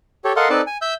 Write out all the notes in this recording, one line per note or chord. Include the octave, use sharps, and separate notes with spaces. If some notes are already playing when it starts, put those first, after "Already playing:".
G4 A4 C#5
A4 A#4 D#5 F5 F#5 C6
C4 D#4 A4 B4 D5 A5
G#5
E5 E6 G6